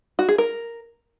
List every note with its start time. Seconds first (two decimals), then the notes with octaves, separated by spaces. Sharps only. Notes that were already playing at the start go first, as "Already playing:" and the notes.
0.19 F#4
0.29 G#4
0.38 A#4